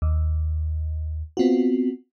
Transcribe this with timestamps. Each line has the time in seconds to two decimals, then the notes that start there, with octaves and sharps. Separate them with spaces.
0.02 D#2
1.37 B3 C4 F4 F#4